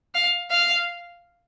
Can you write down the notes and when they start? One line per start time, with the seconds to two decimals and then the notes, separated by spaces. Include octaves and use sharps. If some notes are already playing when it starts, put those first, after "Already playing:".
0.15 F5
0.51 F5